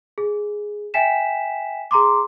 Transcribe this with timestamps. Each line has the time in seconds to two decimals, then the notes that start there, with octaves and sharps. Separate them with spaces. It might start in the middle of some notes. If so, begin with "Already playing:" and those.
0.18 G#4
0.94 E5 G5 G#5 B6 E7
1.91 G#4 A#5 C6 D6